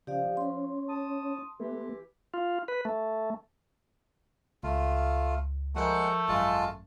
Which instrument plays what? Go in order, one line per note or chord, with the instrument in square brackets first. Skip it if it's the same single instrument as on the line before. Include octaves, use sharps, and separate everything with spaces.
[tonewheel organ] C#3 [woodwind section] F3 [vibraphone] G4 D5 F5
[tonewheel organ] C#4 [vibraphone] C6
[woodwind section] A5 D#6
[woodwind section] E3 G4 [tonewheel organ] A3 B3
[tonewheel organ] F4
B4
A3
[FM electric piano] C#2 [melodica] A3 F4
[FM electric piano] F3 A#4 G6 [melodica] G#3 F#5 [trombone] A3
[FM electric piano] G#1 F#2 [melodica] G#3 F4 A5